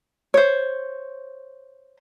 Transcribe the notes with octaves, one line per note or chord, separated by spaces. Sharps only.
C5 C#5